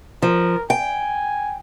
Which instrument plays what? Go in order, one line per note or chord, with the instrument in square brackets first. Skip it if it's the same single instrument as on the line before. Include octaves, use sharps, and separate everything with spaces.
[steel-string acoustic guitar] F3 [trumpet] A#4
[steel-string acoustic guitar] G5 [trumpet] G#5